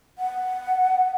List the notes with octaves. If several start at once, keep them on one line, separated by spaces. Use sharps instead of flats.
F#5